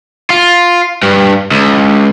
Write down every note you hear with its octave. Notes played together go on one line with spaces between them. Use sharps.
F4
G2
C#2